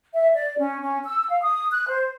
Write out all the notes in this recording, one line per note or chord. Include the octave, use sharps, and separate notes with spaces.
E5
D5
C#4
C#4
E6
F5
D#6
F#6
C5